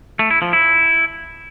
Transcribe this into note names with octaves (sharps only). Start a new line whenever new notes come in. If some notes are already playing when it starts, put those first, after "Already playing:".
A3
E4
F3
E4